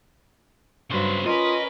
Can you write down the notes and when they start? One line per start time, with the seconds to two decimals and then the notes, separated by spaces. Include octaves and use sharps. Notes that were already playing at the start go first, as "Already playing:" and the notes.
0.90 G2 C#3 F#3 B4 C5
1.26 C#4 F4 A#4 B4 D#5